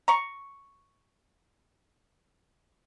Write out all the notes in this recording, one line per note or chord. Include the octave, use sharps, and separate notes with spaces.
A#5 C#6